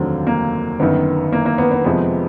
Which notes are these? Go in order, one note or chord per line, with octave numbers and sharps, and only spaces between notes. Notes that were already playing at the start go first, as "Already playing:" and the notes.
Already playing: F1 D#2 D3 F#3 A3 C4
A#3
G1 F#2 D#3 B3
A#3
A#3
B3
B3
F2 C3 F3 G#3 B3